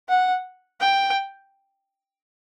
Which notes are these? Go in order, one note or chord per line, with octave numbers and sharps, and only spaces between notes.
F#5
G5